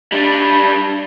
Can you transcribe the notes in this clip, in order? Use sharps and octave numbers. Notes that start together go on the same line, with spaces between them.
G3 D4